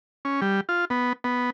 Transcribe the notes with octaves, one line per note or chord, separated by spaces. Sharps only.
C#4
G3
F4
B3
B3